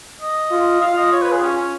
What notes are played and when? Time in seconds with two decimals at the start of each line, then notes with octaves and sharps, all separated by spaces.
0.21 D#5
0.51 F4
0.81 F4 F5
0.97 D#5
1.12 C#5
1.22 B4
1.32 G#4
1.42 C#4
1.57 C#4